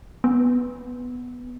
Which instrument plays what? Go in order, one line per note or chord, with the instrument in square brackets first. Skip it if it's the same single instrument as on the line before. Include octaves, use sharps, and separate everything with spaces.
[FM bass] B3